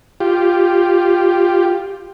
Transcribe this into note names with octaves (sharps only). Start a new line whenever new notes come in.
F4 G4